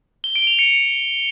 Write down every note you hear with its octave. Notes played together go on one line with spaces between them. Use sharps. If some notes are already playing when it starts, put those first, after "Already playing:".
G7
D7
F7
C#7